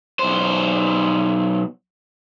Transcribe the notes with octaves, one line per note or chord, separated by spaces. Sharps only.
B1 C5